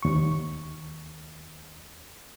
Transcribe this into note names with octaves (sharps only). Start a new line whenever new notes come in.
D#2 C#6